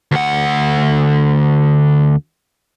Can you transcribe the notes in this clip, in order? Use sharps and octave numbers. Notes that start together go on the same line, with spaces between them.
D2 F#5